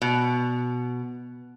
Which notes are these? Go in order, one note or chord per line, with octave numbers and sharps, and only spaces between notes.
B2